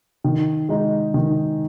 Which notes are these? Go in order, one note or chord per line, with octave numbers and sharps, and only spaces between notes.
D#3
G#3 D#4
D#3